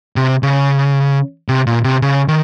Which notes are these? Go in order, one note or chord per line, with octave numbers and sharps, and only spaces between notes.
C3
C#3
C3
A#2
C3
C#3
D#3